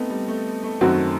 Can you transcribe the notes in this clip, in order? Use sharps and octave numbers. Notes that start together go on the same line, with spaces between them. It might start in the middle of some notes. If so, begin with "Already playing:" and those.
Already playing: A3 B3 C4 D#4
G3
A3
A3
F#2 D#3 F#3 A3 C4 F#4